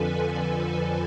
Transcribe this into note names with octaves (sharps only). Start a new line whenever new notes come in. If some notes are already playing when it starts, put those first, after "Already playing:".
Already playing: F2 D3 F3 A4 B4 G#5
G#5